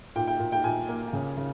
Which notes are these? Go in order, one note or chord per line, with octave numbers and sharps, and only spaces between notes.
A#2 G5
G5
A#2
G5
A#2 G#5
A#3
C#3
C#3